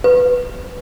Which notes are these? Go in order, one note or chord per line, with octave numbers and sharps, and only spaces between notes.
B4